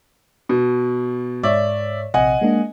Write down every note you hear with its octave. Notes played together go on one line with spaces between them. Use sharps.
B2
G#2 C#5 D5 E5
A#1 C3 D#5 F#5 G#5
G#3 A#3 D4